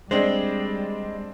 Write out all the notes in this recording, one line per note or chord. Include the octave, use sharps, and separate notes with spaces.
G3 G#3 C4 D4 C5